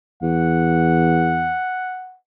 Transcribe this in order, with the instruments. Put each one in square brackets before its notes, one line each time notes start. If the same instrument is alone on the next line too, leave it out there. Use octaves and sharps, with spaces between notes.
[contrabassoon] E2 [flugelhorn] F#5